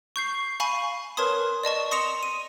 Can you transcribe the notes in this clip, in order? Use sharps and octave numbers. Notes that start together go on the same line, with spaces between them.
C#6 G6 C7
F5 G#5 B5 C#6 D#7
A#4 B4 C#5 A5 C6 D#6
D5 D#5 A5 C#6
C6 D#6 A#6 C#7 E7 F7
D#7